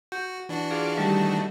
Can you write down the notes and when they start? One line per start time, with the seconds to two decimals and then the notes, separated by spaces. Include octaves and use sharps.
0.12 F#4 G6
0.49 E3 D4 F#4
0.71 F4 G#4 D5
0.97 D#3 G3 A3 G4